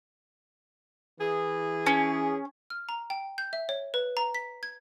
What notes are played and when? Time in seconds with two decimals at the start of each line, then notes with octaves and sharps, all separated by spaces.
1.20 E3 G#4
1.86 C#4
2.70 F6
2.89 A#5
3.10 G5
3.38 G6
3.53 E5
3.69 C#5
3.94 B4
4.17 A#5
4.35 B6
4.63 G#6